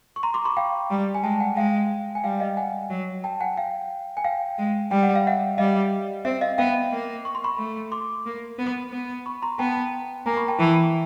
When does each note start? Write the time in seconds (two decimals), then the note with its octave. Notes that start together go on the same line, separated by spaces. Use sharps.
0.16 C#6
0.23 A#5 C6
0.34 C6 D6
0.45 B5 C#6
0.57 F5 G5
0.90 G3
1.15 G#5
1.23 G#3 G5 A5
1.40 F#5 G#5
1.56 G#3 F5 G5
2.15 G#5
2.24 G3 F5 G5
2.40 D#5 F5
2.57 F#5 G#5
2.90 F#3
3.24 G5 A5
3.40 F#5 G#5
3.57 F5 G5
4.17 G#5
4.24 F5 G5
4.58 G#3
4.91 G3 G5
5.03 F#5
5.15 F5
5.27 E5 F#5
5.58 G3 D#5 F5
6.25 C4 E5
6.41 D#5 F5
6.58 B3 F5 G5
6.92 A#3
7.25 C#6
7.35 C6
7.44 B5 C#6
7.58 A3
7.92 C6 D6
8.26 A#3
8.58 B3
8.92 B3
9.26 B5 C#6
9.42 A#5 C6
9.59 B3 G5 A5
10.26 A#3 G#5 A#5
10.37 B5 C#6
10.48 G5 A5
10.60 E3